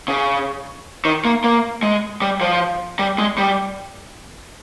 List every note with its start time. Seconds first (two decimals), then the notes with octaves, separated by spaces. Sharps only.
0.08 C#3
1.05 D#3
1.25 A#3
1.44 A#3
1.83 G#3
2.21 G3
2.41 F3
2.99 G3
3.18 G#3
3.38 G3